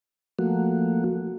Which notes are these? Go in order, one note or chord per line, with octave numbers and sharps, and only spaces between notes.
F3 A3 A#3 F#4